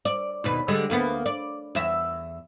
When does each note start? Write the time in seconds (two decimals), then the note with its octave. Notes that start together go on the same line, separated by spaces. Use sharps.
0.05 D5
0.44 D#2 B2 B4
0.68 D3 G3 G#3
0.90 D2 A#3 B3
1.26 D5
1.75 E2 E5